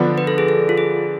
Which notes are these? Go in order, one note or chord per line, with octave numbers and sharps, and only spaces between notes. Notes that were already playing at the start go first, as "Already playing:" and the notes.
Already playing: D3 F3 B3 D4
B4
A4
G#4
A4
F4
G#4